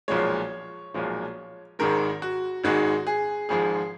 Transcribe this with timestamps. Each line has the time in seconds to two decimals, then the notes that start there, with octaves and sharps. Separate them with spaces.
0.08 B1 A#2 F3 G#3 C#5
0.94 B1 A#2 F3 G#3
1.79 G#1 G#2 D#3 G#3 A#4
2.22 F#4
2.64 G#1 G#2 D#3 G#3 F#4
3.07 G#4
3.49 G#1 G#2 F3 G#3 G#4